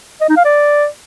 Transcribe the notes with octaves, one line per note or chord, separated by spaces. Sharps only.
D#5
D#4
F5
D5